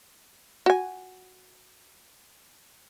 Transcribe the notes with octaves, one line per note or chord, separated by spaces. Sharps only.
F#4 G#5